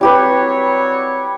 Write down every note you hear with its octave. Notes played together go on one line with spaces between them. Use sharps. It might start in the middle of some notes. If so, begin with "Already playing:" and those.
F#3 G3 C4 G4 B4 C#5